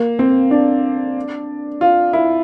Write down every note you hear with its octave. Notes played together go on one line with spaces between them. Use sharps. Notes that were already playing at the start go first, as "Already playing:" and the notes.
Already playing: A#3
C4
D4
F4
E4